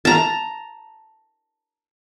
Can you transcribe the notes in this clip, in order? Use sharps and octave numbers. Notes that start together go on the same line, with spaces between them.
A5 A#5